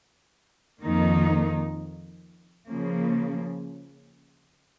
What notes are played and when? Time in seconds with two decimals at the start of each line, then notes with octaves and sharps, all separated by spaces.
0.82 F2 D#3 A#3 D#4
2.71 C#3 F3 A#3